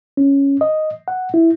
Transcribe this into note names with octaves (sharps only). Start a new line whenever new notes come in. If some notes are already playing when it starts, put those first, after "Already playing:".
C#4
D#5
F#5
E4